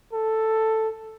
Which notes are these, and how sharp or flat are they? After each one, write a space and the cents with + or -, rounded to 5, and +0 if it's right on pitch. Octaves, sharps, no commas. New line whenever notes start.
A4 +5